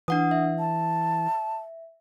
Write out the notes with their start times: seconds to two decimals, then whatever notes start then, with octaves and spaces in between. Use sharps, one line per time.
0.08 E3 D4 F#5 D#6
0.31 E5
0.59 A5